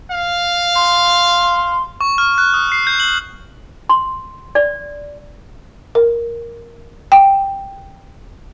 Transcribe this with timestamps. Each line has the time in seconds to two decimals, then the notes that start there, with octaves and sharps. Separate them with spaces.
0.11 F5
0.76 C6
2.01 C#6
2.18 F6
2.38 F#6
2.54 D#6
2.72 C7
2.87 G6
3.00 F#7
3.89 C6
4.55 D5
5.95 A#4
7.12 G5